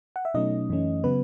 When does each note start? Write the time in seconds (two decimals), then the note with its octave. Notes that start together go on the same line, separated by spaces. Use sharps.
0.16 F#5
0.25 E5
0.34 B2 F#3 A3 C#4 D#4 D#5
0.69 F#2 E3 A3 C#4
1.04 C#3 F#3 B3 B4